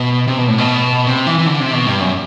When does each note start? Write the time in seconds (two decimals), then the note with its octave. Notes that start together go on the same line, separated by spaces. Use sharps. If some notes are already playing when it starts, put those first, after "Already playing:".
Already playing: B2
0.27 C3
0.38 B2
0.48 A2
0.58 B2
1.07 C3
1.27 E3
1.38 E3
1.47 D3
1.60 C3
1.73 B2
1.86 G2
2.00 F#2